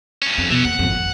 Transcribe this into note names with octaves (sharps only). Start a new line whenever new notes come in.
G2 C#4
F2
B2 E3 C#4
D#2 F#5
G#1 F2
D#3